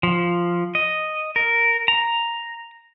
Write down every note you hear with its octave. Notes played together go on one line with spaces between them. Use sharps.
F3
D#5
A#4
A#5